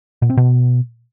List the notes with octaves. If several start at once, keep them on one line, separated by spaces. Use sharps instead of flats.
A#2
C4
B2